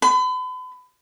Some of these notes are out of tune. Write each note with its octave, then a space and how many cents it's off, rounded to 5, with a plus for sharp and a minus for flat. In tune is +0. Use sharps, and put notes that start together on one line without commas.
B5 +40